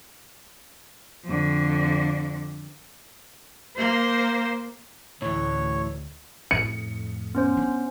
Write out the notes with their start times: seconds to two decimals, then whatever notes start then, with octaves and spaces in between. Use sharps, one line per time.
1.25 F2 D3
3.76 A#3 C5
5.22 D2 A2 E3 C#5
6.51 F2 A2 C#7
7.35 B3 C#4 C5
7.57 D4